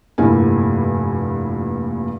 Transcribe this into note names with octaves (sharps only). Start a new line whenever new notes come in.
F1 G2 A#2 A#3 E4 G#5